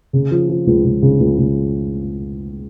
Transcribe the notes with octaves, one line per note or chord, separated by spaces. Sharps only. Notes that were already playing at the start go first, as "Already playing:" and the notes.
C#3
F3
F3
C#2
C#2
C#3
C#2
C#2